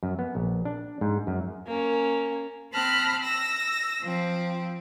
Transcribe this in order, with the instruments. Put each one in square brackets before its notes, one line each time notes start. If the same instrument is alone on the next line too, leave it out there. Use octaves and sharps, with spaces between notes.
[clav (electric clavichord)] F#2
B3
A#1
D4
G#2
F#2
[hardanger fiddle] A#3 C#4
[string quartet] C4 A5 B5 F6 F#6 A#6
E6 A#6
F3 C4